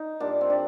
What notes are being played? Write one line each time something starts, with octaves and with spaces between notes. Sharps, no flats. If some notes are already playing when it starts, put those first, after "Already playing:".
Already playing: D#4
A#2 G3 D4
C4
D4